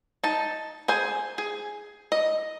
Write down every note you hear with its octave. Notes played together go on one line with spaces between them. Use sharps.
D#4 A5
G#4 C5 G#5
G#4
D#5